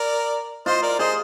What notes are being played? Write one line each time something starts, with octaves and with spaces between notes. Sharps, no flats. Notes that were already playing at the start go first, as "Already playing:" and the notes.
Already playing: A#4 D5
F4 C5 D#5
A#4 D5
G#4 C5 D#5